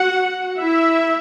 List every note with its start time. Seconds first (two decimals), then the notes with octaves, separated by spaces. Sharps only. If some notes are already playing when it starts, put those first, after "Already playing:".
Already playing: F#4 F#5
0.59 E4 E5